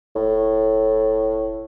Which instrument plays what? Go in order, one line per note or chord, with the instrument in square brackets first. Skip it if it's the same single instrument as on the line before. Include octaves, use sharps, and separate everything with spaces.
[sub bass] E1 [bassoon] A2